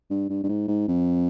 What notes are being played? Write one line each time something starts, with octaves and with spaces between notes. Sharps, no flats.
G2
G2
G2
G#2
G#2
F2